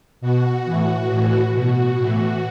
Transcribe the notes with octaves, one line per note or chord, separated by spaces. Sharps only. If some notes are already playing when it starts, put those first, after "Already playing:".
B2 F#4
A2 E3
A2 E3
B2 F#4
A2 E3